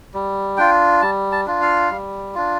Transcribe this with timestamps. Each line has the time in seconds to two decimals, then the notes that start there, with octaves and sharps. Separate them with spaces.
0.14 G3
0.57 D4 F4 G5
1.02 G3 A5
1.32 A5
1.46 D4 F4
1.61 F5
1.91 G3
2.35 D4 F4